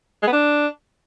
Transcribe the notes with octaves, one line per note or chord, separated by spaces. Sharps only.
G#3
B3
D4